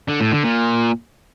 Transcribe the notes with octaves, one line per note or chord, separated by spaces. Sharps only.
D3
A2
D3
A#2